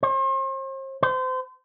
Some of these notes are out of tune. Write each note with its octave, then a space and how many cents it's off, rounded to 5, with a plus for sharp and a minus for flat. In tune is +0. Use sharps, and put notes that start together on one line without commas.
C5 +40
C5 -30